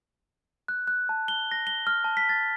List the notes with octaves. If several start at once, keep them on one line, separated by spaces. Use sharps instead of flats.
F#6
F#6
A5
G7
A#6
G7
F6
A5
B6
A6